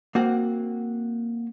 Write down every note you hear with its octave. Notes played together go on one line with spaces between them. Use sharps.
A#3 C4 F#4 F#5